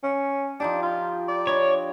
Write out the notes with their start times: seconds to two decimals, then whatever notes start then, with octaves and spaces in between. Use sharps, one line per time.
0.03 C#4
0.60 F3 D4 D#4 G4
0.82 F4
1.28 D5
1.47 D4 C#5 D#5 B5